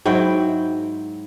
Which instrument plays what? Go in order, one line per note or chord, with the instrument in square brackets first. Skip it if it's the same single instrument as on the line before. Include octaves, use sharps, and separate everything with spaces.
[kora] G#2 F#3 E4 G5